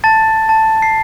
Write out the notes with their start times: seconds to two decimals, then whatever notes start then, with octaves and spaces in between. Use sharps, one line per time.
0.04 A5 A6
0.49 A5
0.82 C7